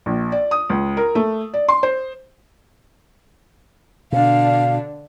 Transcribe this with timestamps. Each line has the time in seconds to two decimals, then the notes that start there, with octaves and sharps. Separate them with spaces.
0.06 A#1
0.32 D5
0.51 D#6
0.70 C#2
0.97 A#4
1.15 A3
1.54 D5
1.68 C6
1.83 C5
4.12 B2 D3 D4 F5